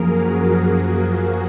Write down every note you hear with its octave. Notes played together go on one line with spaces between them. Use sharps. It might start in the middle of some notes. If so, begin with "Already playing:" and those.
Already playing: F#2 F3 A#3 G#4 A#4
F#4
A#4
G#4